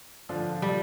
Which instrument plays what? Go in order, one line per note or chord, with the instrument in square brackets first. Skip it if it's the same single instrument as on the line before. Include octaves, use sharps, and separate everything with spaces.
[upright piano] D3 F3 D4
[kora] G3